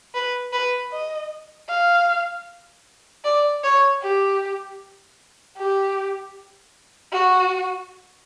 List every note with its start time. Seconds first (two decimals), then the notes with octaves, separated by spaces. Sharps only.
0.15 B4
0.53 B4
0.92 D#5
1.69 F5
3.24 D5
3.64 C#5
4.02 G4
5.58 G4
7.13 F#4